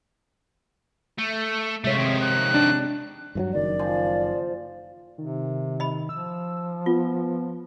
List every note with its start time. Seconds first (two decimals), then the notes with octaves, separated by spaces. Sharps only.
1.19 A3
1.84 C3 G#3 A3 F4 C#5 E5
1.97 D#3 F3
2.20 F#6
2.54 D4
3.35 G2 E3 F#3
3.53 F#1 D#3 D5
3.79 F3 C5 G#5
5.18 C3 D#3
5.80 D#5 B5
6.09 F3 E6
6.86 B3 F4